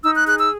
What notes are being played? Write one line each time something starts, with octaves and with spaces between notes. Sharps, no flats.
D#4 E6
F#6
G#4 F#6
E6